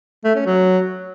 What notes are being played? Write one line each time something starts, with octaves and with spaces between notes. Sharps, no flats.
A3
C#4
F#3